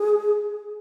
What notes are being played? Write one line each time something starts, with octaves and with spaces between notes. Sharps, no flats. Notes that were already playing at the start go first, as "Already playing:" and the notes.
Already playing: G#4